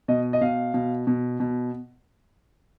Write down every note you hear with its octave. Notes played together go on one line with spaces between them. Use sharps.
B2 D#5
D#5
B2 F5
B2
B2
B2